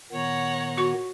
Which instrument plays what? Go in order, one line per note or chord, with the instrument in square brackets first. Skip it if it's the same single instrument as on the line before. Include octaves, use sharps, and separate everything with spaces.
[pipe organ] A#2 D#3 B3 [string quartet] C#5 F#5 A#5
[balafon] F#4 C#6